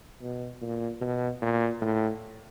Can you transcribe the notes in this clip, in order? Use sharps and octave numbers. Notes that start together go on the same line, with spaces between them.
B2
A#2
B2
A#2
A2